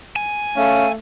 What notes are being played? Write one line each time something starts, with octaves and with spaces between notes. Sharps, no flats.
G#5
A3 C#4 F5